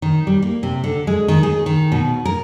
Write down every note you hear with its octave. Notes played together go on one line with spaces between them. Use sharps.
D#3
G3
A#3
C3
D3
G#3
D#3
G#4
D#3
B2
A#4